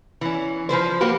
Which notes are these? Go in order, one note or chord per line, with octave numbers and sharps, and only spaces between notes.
E3 C#4
F3 F#3 B4 C5
A#3 F#4 G4 B4